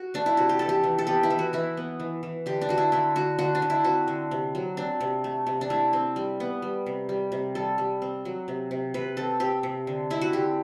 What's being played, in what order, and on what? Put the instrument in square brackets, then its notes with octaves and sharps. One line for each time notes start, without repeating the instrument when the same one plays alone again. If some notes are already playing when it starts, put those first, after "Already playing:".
Already playing: [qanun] F#4
A3 D4
E4
C3 F#4
G4
E3 A4
G4
E3
A4
B3 G4
E4
E3
F#4
E3 E4
B3
E3
E3
D3 G4
D4
D3 F#4
E4
D3 E4
D3 F#4
D3 F#4
D4
D3
E4
C4 F#4
D3
C3
F#3
C4 D4
C3
A3
C3
D4
A3 E4
C4
G3
B3
G3
C3
G3
C3
G3 A4
G3
C4
F#3
C3
C3
C3 B4
C4 A4
C4 G4
C3
D3
C4 E4
F#4
D3 G4